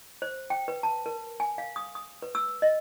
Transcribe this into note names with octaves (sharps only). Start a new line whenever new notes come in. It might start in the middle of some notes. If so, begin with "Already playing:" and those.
C5
G5
B4
A5
A#4
G#5
F5
D#6
D#6
B4
E6
D#5